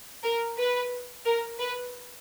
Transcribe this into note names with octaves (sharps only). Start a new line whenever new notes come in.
A#4
B4
A#4
B4